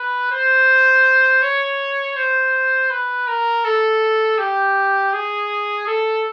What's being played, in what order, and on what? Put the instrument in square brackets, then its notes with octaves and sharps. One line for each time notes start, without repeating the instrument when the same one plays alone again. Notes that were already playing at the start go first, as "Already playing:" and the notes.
Already playing: [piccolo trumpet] B4
C5
C#5
C5
B4
A#4
A4
G4
G#4
A4